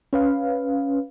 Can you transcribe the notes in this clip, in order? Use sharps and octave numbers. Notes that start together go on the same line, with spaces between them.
C#4 B4 F5